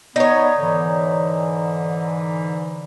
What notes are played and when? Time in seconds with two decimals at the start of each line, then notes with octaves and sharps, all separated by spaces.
0.16 B3 D#4 C#5 D5 A#5 D#6
0.58 G#2 D3 E3